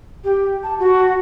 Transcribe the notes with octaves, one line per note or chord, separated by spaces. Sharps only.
G4
A5
F#4